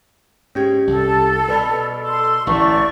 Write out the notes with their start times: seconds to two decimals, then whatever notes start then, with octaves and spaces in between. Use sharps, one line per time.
0.55 G#2 C#4 G4 G#6
0.87 C2 A4
1.48 B2 B4 D5 B5
2.04 A4 C6
2.47 A1 D2 A3 E4 B4 D5 A#5 C#6